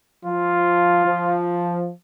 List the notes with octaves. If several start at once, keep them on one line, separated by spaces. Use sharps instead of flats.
F3 F4
F3